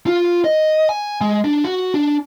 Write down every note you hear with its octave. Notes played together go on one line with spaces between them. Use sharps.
F4
D#5
G#5
G#3
D4
F#4
D4